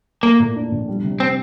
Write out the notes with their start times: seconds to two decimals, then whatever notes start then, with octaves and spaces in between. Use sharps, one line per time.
0.23 A3 A#3
0.40 A#2
0.56 D4
0.72 A#1
0.88 G3
1.04 C3
1.20 C4